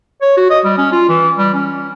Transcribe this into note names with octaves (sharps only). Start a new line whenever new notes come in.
C#5
F#4
D#5
G3
C#4
F4
E3
G3
C#4